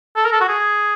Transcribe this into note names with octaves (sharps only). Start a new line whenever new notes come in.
A4
A#4
A4
F#4
G#4